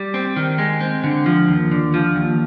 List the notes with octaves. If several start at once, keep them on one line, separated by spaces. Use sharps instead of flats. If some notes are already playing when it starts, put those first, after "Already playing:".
Already playing: G3
C4
D#3
G#3
C4
D3
F3
D#2
D3
F3
D#2